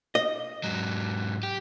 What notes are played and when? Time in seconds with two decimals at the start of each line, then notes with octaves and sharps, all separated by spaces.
0.15 D#5
0.63 G#2 F#3
1.43 G4